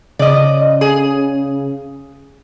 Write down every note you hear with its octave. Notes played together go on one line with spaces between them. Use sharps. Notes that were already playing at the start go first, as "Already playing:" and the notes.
C#3 D5 D#5
G#4